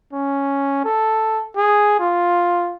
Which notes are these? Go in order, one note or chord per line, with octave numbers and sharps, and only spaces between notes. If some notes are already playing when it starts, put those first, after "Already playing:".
C#4
A4
G#4
F4